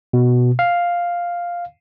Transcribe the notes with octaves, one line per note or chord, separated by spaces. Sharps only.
B2
F5